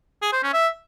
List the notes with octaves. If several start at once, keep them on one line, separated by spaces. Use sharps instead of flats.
G#4
C5
C#4
E5